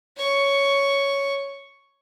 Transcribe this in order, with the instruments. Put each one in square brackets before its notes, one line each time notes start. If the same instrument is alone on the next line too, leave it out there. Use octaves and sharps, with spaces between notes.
[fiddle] C#5 C#6